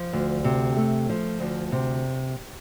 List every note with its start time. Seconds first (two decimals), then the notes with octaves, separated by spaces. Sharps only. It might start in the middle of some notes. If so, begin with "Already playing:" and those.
Already playing: F3
0.13 D2
0.44 C3
0.77 A3
1.09 F3
1.40 D2
1.72 C3